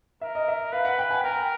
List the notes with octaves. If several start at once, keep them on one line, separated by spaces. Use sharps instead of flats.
A#4 E5
D#5
E5
B4 F5
F#5
G5
G#5
A#4 G5